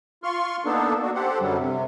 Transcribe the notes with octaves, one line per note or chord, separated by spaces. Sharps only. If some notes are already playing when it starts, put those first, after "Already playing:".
F4 C6 C#6 F6
A#3 B3 D4 D#4 A4
D4 F#4
G4 A4 C5 F#5
F#2 D3 F#3 G3
C3